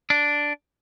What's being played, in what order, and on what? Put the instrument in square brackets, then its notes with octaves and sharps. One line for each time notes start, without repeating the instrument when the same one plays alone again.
[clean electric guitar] D4